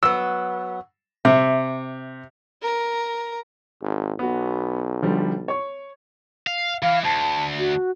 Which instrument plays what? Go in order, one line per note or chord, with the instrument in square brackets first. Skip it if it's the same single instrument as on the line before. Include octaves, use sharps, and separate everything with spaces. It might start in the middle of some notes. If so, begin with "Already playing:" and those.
[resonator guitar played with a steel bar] F#3 B3 [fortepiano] E6
[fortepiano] C3 [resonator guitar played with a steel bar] E5
[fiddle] A#4 A#5
[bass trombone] G#1
[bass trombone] B1 [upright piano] B3 F#4
[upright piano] D3 F3 G3
C#5 C#6
[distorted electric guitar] F5
[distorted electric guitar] E3 [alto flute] F5
[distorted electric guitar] D2 [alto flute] A5
[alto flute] F#4